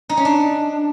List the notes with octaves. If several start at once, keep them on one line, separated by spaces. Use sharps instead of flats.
D#4
C#4
D4